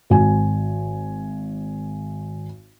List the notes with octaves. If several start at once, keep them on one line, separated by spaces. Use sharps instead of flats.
G#1 G#5